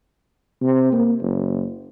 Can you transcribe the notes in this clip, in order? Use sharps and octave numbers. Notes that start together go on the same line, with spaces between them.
C3
A#3
F#1